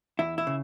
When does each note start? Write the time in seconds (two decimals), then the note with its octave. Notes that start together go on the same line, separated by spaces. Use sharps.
0.19 E2 E4
0.38 E4
0.47 C#3